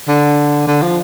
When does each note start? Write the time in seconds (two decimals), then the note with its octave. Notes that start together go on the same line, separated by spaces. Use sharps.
0.08 D3
0.67 D3
0.82 F3